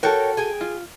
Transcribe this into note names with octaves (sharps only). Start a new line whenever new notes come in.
F#4 A4 A#4 C#5 G5
G#4 G5 G#5
F4